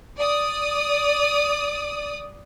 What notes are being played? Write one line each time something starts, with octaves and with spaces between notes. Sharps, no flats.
D5 D#6